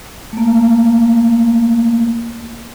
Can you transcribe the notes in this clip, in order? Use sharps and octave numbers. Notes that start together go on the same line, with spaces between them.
A3 A#3